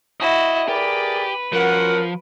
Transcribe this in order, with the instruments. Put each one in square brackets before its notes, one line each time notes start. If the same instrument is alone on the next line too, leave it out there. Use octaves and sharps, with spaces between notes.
[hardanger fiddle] E4 F#4 [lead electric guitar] D#5
[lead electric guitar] G4 [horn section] G#4 A#4 D5 [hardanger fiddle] B4
[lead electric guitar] F3 [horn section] C#4 F#4 F#5 [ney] A#4